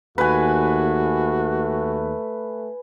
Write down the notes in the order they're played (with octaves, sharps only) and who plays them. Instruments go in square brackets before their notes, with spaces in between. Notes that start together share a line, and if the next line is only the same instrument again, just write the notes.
[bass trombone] D#2 [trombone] A3 [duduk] F#4 [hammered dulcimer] B4 G#5